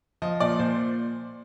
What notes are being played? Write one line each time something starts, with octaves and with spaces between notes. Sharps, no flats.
F3 D#5
A#2 D5
A#2 C5